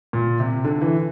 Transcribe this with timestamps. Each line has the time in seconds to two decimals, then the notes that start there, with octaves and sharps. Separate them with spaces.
0.13 A#2
0.40 C3
0.64 D3
0.82 E3